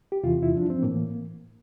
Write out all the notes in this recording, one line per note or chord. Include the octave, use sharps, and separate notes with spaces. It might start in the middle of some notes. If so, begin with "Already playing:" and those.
G4
E2 C3 E3 F4
E4
G2 F3 D4
C4
A2 E3 A#3